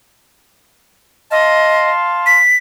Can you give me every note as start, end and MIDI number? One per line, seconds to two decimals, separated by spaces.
1.31 1.90 75
1.31 2.39 77
1.31 2.39 81
1.31 2.39 84
2.26 2.56 95